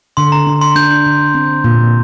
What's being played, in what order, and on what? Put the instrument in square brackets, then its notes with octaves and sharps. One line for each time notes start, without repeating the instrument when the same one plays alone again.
[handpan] D3 [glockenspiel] C6
[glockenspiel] A#5
[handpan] D4
[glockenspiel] C6
[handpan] D4 [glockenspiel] G6
[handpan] D3
C4
A#2